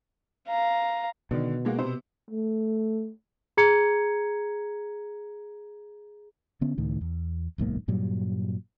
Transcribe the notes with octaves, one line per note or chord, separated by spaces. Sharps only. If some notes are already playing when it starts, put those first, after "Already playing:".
F5 A#5
B2 D3 D#3
G#3 A#3 F#4
C3 B3 C5
A3
G#4 A#5 G#6 C#7
D3 B3 C#4
C#2 A2 D#3
E2
D1 B1 G#2 A#3
G2 A#2 F#3 G3